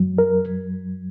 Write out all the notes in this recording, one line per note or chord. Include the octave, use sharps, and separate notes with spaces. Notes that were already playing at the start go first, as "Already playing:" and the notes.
Already playing: F#2 F#3
A#4